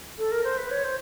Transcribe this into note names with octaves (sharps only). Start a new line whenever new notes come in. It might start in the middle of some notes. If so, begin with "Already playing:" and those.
A4
A#4
C5
B4
C#5
C5